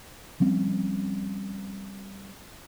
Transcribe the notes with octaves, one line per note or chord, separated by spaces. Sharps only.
F3 G3 C4 C#4